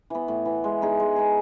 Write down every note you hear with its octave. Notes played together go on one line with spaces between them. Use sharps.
E3 B3
A2
E3 B3
G#3
B3 D#4 G#4
G#3
B3 D#4 G#4